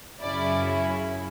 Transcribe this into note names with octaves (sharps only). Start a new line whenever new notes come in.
F#2 C#3 F#3 C#4 E4 D5